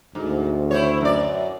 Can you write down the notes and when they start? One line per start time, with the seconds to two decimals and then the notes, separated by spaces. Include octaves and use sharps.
0.15 D2 G#2
0.71 E4 C5 C#5
1.01 F#2 D5